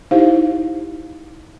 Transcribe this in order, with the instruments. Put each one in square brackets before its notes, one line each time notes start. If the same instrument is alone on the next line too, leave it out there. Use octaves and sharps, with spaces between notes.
[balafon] D#4 E4 G4 C5 F5